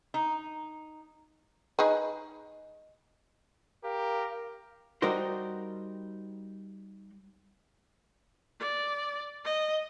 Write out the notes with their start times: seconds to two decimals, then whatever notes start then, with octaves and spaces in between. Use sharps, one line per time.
0.14 D#4
1.79 D#4 G#4 B4
3.84 G4 A#4 F5
5.02 G3 D#4 F#4 A#4 C5
8.59 D5
9.44 D#5